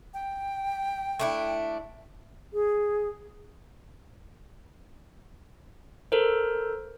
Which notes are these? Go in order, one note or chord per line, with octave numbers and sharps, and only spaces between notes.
G5
A3 D4 E4
G#4
A4 A#4 C5